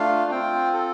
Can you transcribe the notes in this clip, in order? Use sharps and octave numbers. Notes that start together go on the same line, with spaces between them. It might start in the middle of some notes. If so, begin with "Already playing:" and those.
Already playing: A3 D4 F4 F5
C4 F4 G5
A4